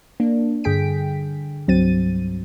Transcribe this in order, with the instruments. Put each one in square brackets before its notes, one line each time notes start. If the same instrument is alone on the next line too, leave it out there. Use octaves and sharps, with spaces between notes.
[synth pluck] A#3 D4
G2 D3 G#4 G5 B6 D7
C2 G2 F#3 C4 A6 D#7